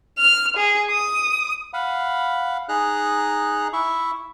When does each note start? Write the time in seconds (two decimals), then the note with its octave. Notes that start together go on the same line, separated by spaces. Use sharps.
0.18 F6
0.57 G#4
0.91 D#6
1.73 F5 F#5 B5
2.69 D#4 G#4 A#5 F#6
3.73 E4 E5 C#6